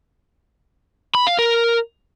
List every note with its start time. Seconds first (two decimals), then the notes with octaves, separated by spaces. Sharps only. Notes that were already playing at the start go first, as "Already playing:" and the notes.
1.15 B5
1.27 F5
1.39 A#4